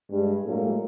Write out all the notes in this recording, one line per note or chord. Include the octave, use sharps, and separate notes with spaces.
G2 G#3
A2 F#3 G#3 A#3 A4